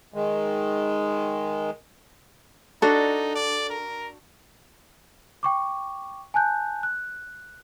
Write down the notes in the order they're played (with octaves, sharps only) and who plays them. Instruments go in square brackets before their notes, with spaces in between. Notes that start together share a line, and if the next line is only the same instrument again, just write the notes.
[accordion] D#3 G#3
[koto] D4 F#4 [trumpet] D#4 [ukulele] A4
[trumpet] D5
A#4
[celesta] G5 C#6 D6
G#5 A5 F#6 G6
F#6